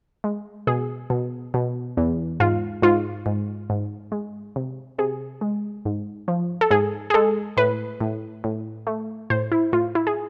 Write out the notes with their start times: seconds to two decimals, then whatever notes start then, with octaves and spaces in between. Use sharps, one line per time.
0.24 G#3
0.67 B2 G#4
1.10 B2
1.54 B2
1.97 E2
2.40 G#2 F4
2.82 G#2 F4
3.26 G#2
3.70 G#2
4.12 G#3
4.56 C3
4.98 C3 G#4
5.41 G#3
5.85 G#2
6.28 F3
6.61 A4
6.71 G#2 G#4
7.10 G#4
7.14 G#3 A4
7.57 A2 B4
8.01 A2
8.44 A2
8.87 A3
9.30 A2 C5
9.52 E4
9.73 A2 F4
9.95 E4
10.07 G#4